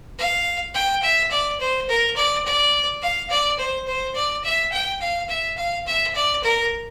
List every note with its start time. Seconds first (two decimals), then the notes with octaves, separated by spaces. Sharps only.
0.18 F5
0.74 G5
1.02 E5
1.31 D5
1.60 C5
1.89 A#4
2.16 D5
2.45 D5
3.02 F5
3.30 D5
3.58 C5
3.87 C5
4.15 D5
4.44 E5
4.72 G5
5.01 F5
5.29 E5
5.57 F5
5.86 E5
6.15 D5
6.43 A#4